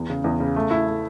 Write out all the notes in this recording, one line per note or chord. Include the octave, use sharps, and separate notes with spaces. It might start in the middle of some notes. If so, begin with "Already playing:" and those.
Already playing: E2
C#3
E2
C#3
A3
E4
A3